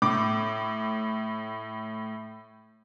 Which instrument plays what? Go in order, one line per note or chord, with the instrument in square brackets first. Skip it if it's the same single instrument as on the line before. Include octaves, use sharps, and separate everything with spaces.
[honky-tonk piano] A2 D6